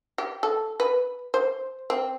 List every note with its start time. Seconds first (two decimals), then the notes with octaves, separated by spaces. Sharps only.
0.18 G4
0.43 A4
0.80 B4
1.34 C5
1.90 C4